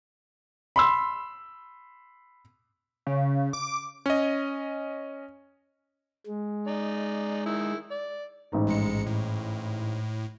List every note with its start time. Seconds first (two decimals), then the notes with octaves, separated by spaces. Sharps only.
0.76 B5 C6 E6
3.07 C#3
3.53 D6
4.06 C#4 D#5
6.26 G#3
6.67 D#4 D5
7.46 D#3 E4
7.91 D5
8.52 A1 G#2 D#4
8.67 A#1 G#3 C#7
9.06 A2